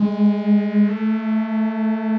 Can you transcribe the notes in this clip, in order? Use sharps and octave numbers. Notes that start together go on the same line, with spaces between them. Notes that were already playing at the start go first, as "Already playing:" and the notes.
Already playing: G#3
A3